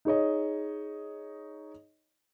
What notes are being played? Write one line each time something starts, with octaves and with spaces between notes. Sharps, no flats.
D#4 G#4 C#5 D#5